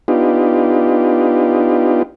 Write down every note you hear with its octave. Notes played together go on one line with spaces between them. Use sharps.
B3 D4 D#4 F4 G4